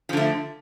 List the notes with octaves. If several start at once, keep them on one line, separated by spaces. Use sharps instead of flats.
D3 F3 A3